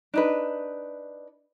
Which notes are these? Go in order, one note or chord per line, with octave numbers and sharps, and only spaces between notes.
D4 D#4 B4